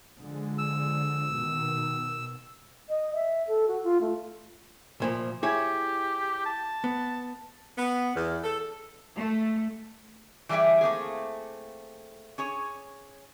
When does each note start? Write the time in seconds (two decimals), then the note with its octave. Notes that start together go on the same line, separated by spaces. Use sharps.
0.19 D3 F3 G#3
0.58 E6
1.32 B2 D#3
2.88 D#5
3.14 E5
3.47 A4
3.67 F#4
3.83 F4
4.00 A3
5.00 C2 A#2 F3
5.43 E4 G4 G#4 C#5
6.45 A5
6.84 B3
7.76 B3
8.15 E2
8.43 A4
9.15 A3
10.49 E3 G3 G4 G#4 E5 G5
10.81 A3 A#3 C4 G#4
12.38 C#4 G#4 C#5